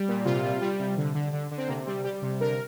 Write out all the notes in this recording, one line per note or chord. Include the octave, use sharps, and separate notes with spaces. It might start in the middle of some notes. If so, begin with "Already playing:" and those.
Already playing: G3
A#2
C3 F4
G3
G3
C3
D3
D3
D3
D3
C4
C3 A#3
G3 C4
G3 G4
C3
D3 A#4